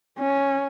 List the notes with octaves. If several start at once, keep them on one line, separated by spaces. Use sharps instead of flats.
C#4